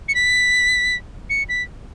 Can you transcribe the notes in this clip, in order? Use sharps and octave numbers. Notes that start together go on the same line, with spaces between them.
C#7
B6
C#7
B6